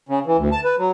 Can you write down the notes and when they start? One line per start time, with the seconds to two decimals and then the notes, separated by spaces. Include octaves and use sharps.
0.09 C#3
0.26 E3
0.38 D2
0.52 A5
0.64 B4
0.79 F#3